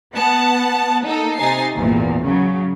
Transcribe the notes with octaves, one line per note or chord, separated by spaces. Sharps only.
B3 F#5 A5
A#3 D#4 A4
C3 D#4 G#5 A6 C7
G#1 E2 A#2
C#3 F#3